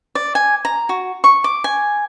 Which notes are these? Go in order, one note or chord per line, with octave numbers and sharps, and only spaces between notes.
D5
G#5
A#5
F#4
C#6
D6
G#5